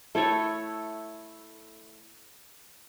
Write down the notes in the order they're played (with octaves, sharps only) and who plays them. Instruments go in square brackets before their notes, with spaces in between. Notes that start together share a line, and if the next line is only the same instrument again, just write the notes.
[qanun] A3 E4 A4 C#5